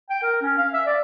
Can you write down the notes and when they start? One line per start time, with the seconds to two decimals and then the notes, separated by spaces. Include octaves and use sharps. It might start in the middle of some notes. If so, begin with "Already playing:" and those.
0.10 G5
0.22 A#4
0.42 C#4
0.58 F5
0.73 E5
0.86 D5